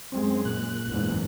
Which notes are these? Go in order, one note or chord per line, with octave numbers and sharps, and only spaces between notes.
F#2 G#3 C4
A#2 F#6
F#1 E2 G#2